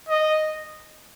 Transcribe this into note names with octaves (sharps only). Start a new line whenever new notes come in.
D#5